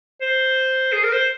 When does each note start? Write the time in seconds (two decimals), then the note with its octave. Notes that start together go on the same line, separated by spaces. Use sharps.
0.21 C5
0.92 G#4
1.04 A#4
1.13 C5